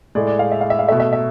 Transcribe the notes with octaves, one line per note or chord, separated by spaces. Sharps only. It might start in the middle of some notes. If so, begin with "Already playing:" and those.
A2 G#3 D5
D5
F5
E5
F5
E5
F5
B2 A3 E5
E5
E5